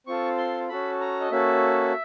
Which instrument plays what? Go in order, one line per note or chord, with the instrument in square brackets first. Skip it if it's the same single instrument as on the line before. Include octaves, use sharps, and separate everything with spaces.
[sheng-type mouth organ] C4 F4 A4 C#6
C6
C#4 F#4 A4 B5
A#5
D#5
A#3 C#4 F#4 A4 E5